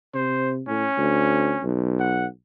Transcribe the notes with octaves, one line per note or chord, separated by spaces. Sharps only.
C3 C5
A2 C#4
D2
B1
F#5